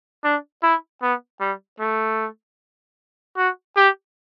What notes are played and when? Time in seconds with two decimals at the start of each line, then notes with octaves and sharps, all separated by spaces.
0.24 D4
0.63 E4
1.02 B3
1.40 G3
1.80 A3
3.37 F#4
3.77 G4